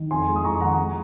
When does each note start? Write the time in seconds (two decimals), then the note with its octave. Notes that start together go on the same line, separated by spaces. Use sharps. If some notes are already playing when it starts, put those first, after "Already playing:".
Already playing: D#3
0.10 F2 G#5 C6
0.27 G#3
0.36 D#6
0.44 F2 A#5 C#6
0.60 D#3 F#5 A#5
0.77 G#3